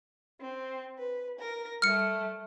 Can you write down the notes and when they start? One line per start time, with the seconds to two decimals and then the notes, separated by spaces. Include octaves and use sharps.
0.41 C4
0.98 B4
1.39 A#4 A#6
1.82 G3 A3 F6 C#7